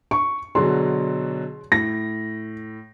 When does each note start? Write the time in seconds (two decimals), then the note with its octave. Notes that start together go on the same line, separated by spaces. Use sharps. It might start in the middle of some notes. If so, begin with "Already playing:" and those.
0.11 C#6
0.55 B2 D3 F#3 G#4 C6
1.72 A2 A#6